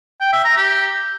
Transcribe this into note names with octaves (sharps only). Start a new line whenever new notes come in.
G5
E5
A#5
G4